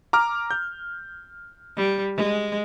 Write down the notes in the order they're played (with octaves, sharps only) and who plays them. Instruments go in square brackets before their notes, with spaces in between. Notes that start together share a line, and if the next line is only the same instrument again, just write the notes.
[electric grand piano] A#5 D6 F6
G6
[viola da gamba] G3
G#3